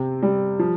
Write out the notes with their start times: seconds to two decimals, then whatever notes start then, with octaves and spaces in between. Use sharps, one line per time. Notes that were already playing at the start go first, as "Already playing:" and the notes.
Already playing: C3 C4
0.23 G3
0.59 F3